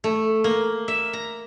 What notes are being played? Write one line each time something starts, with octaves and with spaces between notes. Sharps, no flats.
A3
A#3
E5
A#5